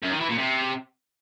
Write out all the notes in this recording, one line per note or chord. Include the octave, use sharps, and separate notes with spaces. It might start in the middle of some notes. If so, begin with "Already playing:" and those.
F#2
D#3
E3
A#2
C3